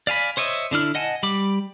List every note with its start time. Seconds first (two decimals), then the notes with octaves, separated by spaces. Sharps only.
0.07 D5 F5 G#5 B5
0.37 C5 C#5 D#5 E5
0.71 D3 D4 E4 F6
0.95 D#5 F#5 G#5 A5
1.23 G3 B5 D6